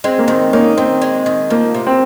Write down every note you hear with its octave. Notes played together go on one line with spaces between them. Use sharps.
G#3 C4
A#3
D#3 C4
A#3 C#4 D#4
D#3 C4
G#3
D#3
F3 A#3
C3
C4